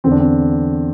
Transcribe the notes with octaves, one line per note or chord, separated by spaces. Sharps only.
E2 D3 C4
D4
C4